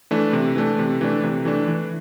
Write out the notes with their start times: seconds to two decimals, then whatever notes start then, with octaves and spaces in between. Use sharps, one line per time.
0.11 E3 A3 D4
0.33 C3
0.56 E3 A3 D4
0.79 C3
1.01 E3 A3 D4
1.24 C3
1.45 E3 A3 D4
1.68 E3